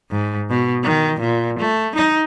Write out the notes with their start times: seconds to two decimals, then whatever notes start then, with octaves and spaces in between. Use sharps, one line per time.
0.12 G#2
0.50 B2
0.83 D#3
1.20 A#2
1.59 A3
1.95 D#4